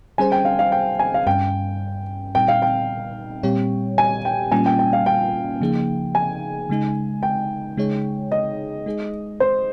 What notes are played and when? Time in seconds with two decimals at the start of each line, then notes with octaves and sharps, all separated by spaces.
0.18 G3 C#4 G#4 C5 G#5
0.32 G5
0.45 F5
0.59 F5
0.72 G5
0.99 G#5
1.14 F5
1.26 G2 G3 C#4 G5
2.35 A#2 G3 C4 D#4 G5
2.48 F5
2.62 G5
3.43 A#2 G3 C4 G4 C#5
3.98 G#5
4.25 G5
4.52 A#2 G3 A#3 C#4 F4 G#5
4.66 G5
4.79 G5
4.93 F5
5.06 G5
5.61 C#3 F3 A#3 D#4 G#4
6.15 G#5
6.69 C#3 G#3 D#4
7.23 G5
7.77 C#3 G#3 D#4 G#4 C#5
8.32 D#5
8.86 G#3 D#4 G#4
9.40 C5